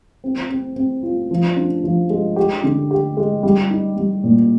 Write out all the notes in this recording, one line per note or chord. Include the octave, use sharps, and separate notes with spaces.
C4
C4
C4
F4
F3
D4
F3
G#3
G4
D3
G4
G#3
G3
D#4
G3
A#2